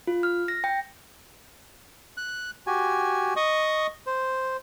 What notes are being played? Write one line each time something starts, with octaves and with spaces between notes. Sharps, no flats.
F4
F6
A#6
G5
F#6
F#4 G4 G#5
D#5 C#6 D#6
C5